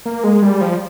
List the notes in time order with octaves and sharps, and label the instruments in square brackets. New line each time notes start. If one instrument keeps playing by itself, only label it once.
[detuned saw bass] A#3
G#3
G3
F3